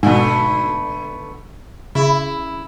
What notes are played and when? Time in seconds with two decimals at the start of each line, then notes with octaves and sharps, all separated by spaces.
0.03 G#2 B2 D3 A3 B3
1.95 C#3 E4